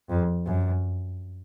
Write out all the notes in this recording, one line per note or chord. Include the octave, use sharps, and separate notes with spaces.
F2
F#2